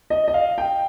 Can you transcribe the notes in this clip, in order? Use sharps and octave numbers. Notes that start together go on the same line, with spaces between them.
D#5
D#5
F5
G5